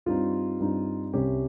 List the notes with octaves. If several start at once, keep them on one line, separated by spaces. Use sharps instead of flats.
G2 G3 C4 D#4 F4
G2 G3 C4 D#4
C2 C3 G3 C#4 G4